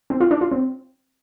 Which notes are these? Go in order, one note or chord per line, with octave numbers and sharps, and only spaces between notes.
C4
F4
D4
F4
C4